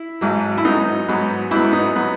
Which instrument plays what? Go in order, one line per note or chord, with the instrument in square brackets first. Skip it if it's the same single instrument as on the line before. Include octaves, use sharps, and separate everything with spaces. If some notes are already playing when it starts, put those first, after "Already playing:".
Already playing: [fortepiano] E4
G#1 G#2 F#3
E4
G#2 F#3 B3 D#4
G#2 F#3 B3
G#2 F#3 B3 E4
D#4
F#3 B3